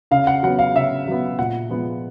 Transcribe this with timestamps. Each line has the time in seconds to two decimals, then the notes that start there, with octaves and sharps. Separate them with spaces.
0.11 C#3 F5
0.27 F#5
0.43 F#3 B3 F#5
0.59 F5
0.75 C#3 E5
1.07 F#3 B3
1.39 A#2 F#5
1.70 F3 G#3 B3